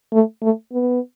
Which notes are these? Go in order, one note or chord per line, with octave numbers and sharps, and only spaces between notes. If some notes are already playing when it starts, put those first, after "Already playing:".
A3
A3
B3